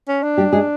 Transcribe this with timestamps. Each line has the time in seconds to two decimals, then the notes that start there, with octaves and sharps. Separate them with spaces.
0.08 C#4
0.23 D4
0.38 G3 G4
0.53 G#3 G#4